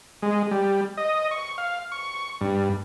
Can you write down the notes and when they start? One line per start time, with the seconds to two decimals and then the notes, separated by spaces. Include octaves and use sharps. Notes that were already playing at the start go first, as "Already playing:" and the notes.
0.22 G#3
0.51 G3
0.97 D#5
1.31 C#6
1.58 F5
1.92 C#6
2.41 G2